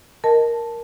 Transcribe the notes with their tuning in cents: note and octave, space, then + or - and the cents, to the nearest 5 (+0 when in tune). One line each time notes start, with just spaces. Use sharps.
A#4 +5 D#5 +0 A5 +0